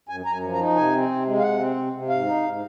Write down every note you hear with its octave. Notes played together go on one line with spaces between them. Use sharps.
F#2 G#5
F#2 A#5
G#5
F3
A#5
D#4
C3 G#5
C4
C3
G#3
F5
C3 F#5
C4
C3
C3
G#2 F5
D#4
G#2